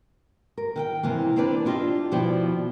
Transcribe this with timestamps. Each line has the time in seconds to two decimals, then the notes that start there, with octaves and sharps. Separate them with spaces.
0.57 A#4
0.76 D#3 F5 G5
1.03 C3 E3 A#3
1.36 A#3 C4 D4 B4 C5 D5
1.65 B3 D4 F4 G4 D#5 E5
2.11 D#2 B2 F3 E4 D5 G5